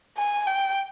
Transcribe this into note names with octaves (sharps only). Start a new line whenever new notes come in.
G#5
G5